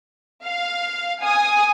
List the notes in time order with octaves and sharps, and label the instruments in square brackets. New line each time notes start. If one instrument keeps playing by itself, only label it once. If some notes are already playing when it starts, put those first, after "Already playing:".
[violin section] F5
G#5 D#6